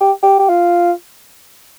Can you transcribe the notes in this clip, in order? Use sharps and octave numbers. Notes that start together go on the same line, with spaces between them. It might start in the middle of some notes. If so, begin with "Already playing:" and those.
G4
G4
G4
F4